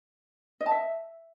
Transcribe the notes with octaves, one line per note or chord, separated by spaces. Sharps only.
D#5
A5
E5